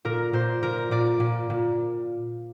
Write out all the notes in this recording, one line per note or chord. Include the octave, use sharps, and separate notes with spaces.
A#2 A#4
A#2 C5
A#2 A#4
A#2 D5
A#2
A#2